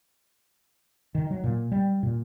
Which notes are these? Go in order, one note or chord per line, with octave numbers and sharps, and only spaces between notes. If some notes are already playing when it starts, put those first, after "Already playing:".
D#3
F#3
A#2
G3
A#2